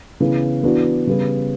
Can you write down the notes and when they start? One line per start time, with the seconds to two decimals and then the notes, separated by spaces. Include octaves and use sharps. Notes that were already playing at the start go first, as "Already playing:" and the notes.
0.20 C#3 E3 B3
0.63 E3 B3 D4 F#4
1.07 C#3 G3 B3